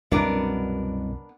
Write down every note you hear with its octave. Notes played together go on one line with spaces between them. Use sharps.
C2 F#2 B2 B3 D4 A#4